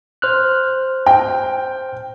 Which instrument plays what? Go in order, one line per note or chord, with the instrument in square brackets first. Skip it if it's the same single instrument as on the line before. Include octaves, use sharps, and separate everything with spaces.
[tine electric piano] C5 F6 F#6
[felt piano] G5